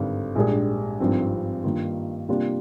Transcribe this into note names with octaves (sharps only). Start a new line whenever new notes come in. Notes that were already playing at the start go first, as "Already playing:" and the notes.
Already playing: G#1 G2 D3
A#1 G#2 G3 D4 G#4
G#1 G2 F3 C4
G2 D#3 A#3 F4
C3 G3 A#3 D4 F4